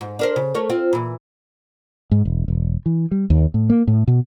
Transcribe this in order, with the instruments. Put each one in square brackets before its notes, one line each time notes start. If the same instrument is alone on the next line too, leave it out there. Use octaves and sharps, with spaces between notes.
[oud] G#2
D4 A#4 C5
C#3
A3 A#4 C#5
C4 F4
A#2 E3
[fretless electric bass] G#2
E1
E1
E3
G3
D#2
A2
A#3
A2
B2